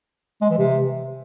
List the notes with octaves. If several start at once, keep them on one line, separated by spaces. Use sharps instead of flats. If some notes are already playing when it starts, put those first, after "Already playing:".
G#3
E3
C3